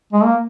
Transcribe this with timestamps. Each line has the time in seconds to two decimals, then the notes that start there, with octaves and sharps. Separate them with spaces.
0.13 G#3
0.24 A#3